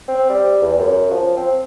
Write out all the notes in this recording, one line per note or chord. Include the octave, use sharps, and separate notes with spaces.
C4
G3
E2
F#2
F3
C4